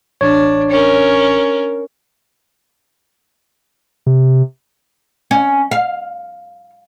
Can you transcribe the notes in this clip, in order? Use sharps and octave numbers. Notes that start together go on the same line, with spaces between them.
A1 D4 C#5
C#4 A#4
C3
C#4
F5